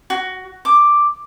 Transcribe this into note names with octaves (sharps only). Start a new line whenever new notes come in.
F#4
D6